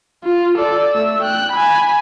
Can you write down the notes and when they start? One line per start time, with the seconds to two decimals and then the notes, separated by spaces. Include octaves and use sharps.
0.24 F4
0.58 A4 D5
0.93 A3 E6
1.23 G5 F#6
1.52 G#5 B5